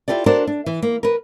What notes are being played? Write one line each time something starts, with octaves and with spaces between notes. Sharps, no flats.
E4 F4 G4 A4 D5
D4 F#4 A4 A#4 C5 D5
D4
E3
A#3
A#4 B4